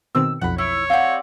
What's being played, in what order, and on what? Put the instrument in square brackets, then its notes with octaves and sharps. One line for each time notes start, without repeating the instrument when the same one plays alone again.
[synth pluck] B2 D#3 C4 [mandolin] E6
[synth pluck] B1 F2 [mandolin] F#5 B5
[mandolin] E4 [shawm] C#5
[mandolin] C4 G4 D5 [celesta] F5 F#5